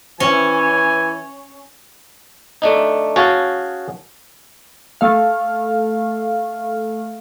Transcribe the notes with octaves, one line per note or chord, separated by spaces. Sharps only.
E3 C#4 G#5
A3 D4 D#4
C#4 F#4 G#4 F5 A5
A3 F5